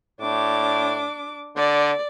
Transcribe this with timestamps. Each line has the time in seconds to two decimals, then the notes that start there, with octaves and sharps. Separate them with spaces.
0.21 A2 D4 D6
1.56 D3 D5